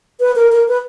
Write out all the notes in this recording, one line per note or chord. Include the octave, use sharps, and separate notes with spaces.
B4
A#4
A#4
B4